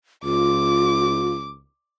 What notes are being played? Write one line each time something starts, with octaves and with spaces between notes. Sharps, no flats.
C#2 F4 D6